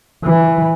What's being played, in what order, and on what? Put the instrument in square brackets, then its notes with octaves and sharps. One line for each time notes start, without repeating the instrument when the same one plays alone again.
[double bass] E3